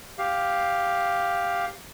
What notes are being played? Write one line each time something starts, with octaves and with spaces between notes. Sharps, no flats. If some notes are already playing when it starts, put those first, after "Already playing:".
G4 F5